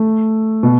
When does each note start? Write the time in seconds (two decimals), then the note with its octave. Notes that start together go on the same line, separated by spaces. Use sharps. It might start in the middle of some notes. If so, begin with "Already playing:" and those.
Already playing: A3
0.63 B2